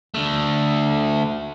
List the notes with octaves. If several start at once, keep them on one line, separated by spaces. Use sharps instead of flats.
D3 A3